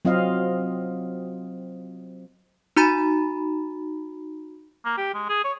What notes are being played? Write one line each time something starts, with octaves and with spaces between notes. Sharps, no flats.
F#3 C4 F4 D#5 F5
D#4 F#4 A#5 B5 A6
A#3
G4
G#3
G#4
C#5